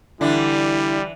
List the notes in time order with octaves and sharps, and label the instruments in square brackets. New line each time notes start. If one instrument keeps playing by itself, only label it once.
[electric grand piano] D3 [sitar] E3 D4 [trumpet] G3 [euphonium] E4